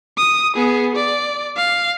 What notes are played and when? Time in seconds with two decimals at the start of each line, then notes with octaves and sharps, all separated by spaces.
0.17 D#6
0.56 B3 G#4
0.96 D5
1.57 F5